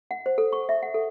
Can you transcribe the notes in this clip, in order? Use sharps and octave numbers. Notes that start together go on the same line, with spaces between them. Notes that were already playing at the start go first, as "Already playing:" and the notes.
F#5
C5
A4
C#6
E5
F#5
A4